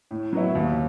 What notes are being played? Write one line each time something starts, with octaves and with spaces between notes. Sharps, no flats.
A2
F#3 B3 E4
D#2